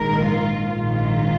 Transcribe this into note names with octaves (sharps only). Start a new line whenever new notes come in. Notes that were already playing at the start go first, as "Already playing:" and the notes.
Already playing: A#1 G#2 D#3 A#4
F4
A#1 G#2 D#3 F4